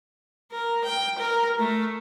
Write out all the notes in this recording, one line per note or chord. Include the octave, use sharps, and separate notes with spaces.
A#4
G5
A#4
A3